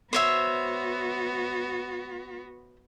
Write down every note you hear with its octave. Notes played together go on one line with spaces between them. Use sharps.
B3 F#4 C5 C#5 E5